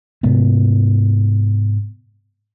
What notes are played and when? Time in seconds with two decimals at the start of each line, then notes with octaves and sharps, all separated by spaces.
0.23 G#2 C3 G#3 B3